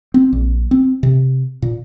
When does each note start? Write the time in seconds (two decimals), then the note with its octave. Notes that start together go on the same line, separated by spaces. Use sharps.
0.14 C4
0.33 A#1
0.71 C4
1.03 C3
1.62 A#2